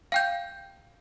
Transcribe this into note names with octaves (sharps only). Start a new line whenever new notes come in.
F5 G5 G6